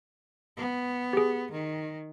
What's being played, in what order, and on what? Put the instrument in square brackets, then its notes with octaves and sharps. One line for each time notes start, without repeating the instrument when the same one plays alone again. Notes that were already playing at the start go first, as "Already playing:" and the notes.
[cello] B3
[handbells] G4 G#4
[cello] D#3